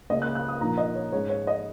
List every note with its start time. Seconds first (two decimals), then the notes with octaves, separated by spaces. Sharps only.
0.10 C#2 C#3 A#3 C#4 D#5
0.22 F#6
0.35 F#6
0.48 D#6
0.60 A#1 A#2 A#3 D#4 A#5
0.78 D#5
0.95 C#5
1.12 G#2 G#3 C#4 C#5
1.29 C#5
1.47 D#5